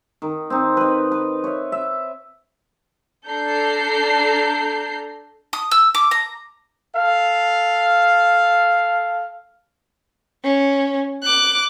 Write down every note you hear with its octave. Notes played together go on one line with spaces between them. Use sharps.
D#3
C4 D#4
B4 D#5
B4
C#5 E5
E5
D4 A4 A#5 G6 C7
D#6
E6
D6
A#5
A4 F5
C#4
D6 F#6